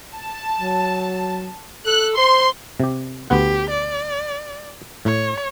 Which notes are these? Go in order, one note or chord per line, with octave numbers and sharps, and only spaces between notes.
A5
F#3
A4 F#6
C5 C6
C3 G4
D2 B3 G4 F#5
D5
A2 C#5